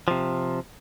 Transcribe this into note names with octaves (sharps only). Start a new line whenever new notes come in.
C3 F3